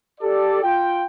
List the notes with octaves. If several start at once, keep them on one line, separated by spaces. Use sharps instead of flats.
G4 A4 D5
F4 G5